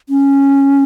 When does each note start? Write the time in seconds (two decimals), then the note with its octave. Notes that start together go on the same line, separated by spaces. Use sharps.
0.09 C#4